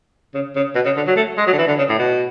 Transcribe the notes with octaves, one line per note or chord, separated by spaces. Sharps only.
C#3
C#3
B2
C#3
D3
F#3
A3
G#3
F#3
D3
E3
D3
C#3
A2
B2